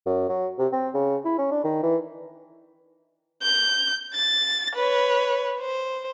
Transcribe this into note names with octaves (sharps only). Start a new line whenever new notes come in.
F#2
F#3
C3
C4
C#3
E4
C#4
D4
D#3
E3
G6
A6
B4 C#5
C5